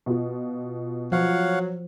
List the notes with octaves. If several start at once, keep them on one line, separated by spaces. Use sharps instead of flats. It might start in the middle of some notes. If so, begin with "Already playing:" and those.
B2 F4
F3 F#3 C#5 F5 F#5